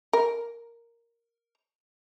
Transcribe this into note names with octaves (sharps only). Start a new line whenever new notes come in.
A#4